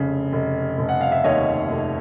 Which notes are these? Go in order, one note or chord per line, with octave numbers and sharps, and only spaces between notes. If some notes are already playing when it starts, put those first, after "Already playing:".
Already playing: F1 C#3
F1
F1
F#5
F5
E5
D#2 C#5 D#5
F1